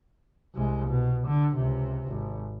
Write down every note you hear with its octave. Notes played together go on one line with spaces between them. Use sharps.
C2 G#3
B2
D3
C#2 C3
G#1